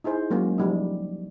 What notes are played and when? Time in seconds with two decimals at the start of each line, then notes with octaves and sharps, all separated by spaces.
0.04 D#4 E4 G#4 C5
0.30 F#3 G#3 A#3 C#4
0.58 F3 G3 D#4